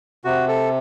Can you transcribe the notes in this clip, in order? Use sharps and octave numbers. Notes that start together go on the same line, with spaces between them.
C3 F#4
A4